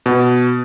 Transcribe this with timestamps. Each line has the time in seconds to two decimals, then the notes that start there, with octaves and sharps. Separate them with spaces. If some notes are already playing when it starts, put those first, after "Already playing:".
0.06 B2